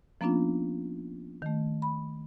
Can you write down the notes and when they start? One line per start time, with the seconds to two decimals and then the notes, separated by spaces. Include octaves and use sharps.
0.21 F3 A#3 B3 C#4 D4 F4
1.42 D#3 A3
1.82 B5